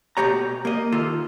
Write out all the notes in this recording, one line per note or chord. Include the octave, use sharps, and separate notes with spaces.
B2 A3 G4 C#5 A#5
A#3 D#5
D#3 F4 A4